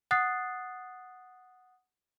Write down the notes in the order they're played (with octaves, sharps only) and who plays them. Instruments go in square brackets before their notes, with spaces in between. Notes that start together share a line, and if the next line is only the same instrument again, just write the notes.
[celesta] F#5 D#6 F#6 A6 C7